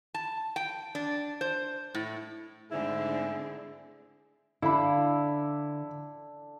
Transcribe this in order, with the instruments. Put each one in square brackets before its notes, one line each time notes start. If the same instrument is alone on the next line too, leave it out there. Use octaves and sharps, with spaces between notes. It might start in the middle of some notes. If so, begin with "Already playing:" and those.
[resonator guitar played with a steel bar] A5
G5
D4
C5
A2
[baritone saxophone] G#2 [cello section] D3 A3 C4 [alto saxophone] E4 [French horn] G#4
[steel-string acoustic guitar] D3 [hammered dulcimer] D4 A4 F5 [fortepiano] E4 B5